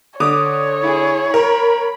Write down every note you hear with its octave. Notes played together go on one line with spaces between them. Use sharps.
D3 C#5 D6 D#6
E4 G#4
A#4 B5